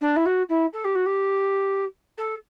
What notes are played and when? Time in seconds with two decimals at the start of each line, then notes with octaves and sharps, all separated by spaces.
0.01 D4
0.16 E4
0.25 F#4
0.49 E4
0.73 A4
0.84 G4
0.95 F#4
1.06 G4
2.17 A4